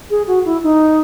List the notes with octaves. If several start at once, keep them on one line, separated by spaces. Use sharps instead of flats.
G#4
F#4
E4
D#4